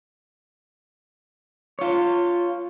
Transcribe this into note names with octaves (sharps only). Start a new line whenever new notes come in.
F4 C#5